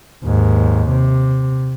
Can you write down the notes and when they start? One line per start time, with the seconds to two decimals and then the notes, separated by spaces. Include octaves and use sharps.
0.24 D#2 G#2
0.89 C3